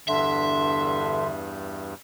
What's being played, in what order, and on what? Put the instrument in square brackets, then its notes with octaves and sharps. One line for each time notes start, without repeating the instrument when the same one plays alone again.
[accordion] E2 G2 G3 [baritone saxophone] D3 [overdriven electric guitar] E5 [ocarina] C6